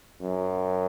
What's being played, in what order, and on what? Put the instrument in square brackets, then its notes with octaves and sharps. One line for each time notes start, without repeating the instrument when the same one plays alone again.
[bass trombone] F#2